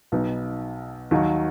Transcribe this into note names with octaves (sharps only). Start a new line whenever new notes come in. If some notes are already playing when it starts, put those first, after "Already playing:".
B1 B2 B3 D#4
D#2 D#3 F#3 D#4